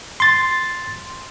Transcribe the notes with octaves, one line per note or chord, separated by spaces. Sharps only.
C6 A6